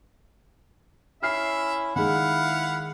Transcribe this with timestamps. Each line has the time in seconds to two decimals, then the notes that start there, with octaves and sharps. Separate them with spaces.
1.23 C#4 E4 E5 F6 C7
1.96 D#3 G#3 E4 F5 F#5 B5